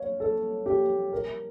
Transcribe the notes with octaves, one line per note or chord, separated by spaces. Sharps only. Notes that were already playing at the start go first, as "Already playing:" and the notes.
Already playing: C#5 F5
A4
G4
A#4